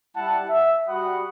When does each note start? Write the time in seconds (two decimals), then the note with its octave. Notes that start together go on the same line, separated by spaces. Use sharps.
0.16 G3 E4 F#5 A5
0.48 E5
0.87 G3 F#4 F#5 B5 D#6